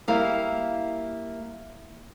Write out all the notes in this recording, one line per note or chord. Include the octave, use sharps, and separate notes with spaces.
G3 A#3 E4 F5